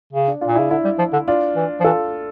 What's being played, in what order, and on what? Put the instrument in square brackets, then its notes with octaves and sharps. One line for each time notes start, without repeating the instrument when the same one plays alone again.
[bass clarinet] C#3
[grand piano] D4
D4 F4
[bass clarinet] A#2
[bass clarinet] C#3 [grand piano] E4
[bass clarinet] D3 [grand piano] E4
[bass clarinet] G3
F3
D3
[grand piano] D4 F4
[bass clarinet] E3
F3
[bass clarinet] E3 [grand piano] F4 A4